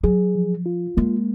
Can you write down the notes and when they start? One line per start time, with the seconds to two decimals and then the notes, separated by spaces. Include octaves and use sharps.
0.03 F#3 G#4
0.35 F3
0.66 F4
0.97 G#3 A#3